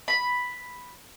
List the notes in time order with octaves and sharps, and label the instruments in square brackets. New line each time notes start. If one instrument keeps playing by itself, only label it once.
[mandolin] B5